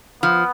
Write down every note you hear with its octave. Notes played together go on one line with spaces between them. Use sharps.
F3 B3